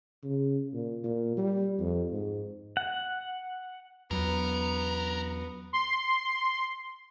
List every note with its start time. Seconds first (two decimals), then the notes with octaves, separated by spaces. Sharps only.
0.23 C#3
0.74 A#2
1.04 A#2
1.37 G3
1.80 F2
2.12 G#2
2.77 F#5
4.11 E2 F#3 B3 A#4
5.73 C6